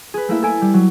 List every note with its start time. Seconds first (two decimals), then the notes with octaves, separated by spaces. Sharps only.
0.14 G#4 B4
0.28 A3 A#3 E4 E5
0.43 A4 G#5 D7
0.62 G3
0.74 F#3